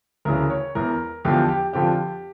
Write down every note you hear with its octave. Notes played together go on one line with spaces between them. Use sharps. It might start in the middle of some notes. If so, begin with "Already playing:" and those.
D2 C#3 E3 A#4
C#5
E2 E3 A#4
E2 D3 F3 G4
G4
F2 D3 F3 G4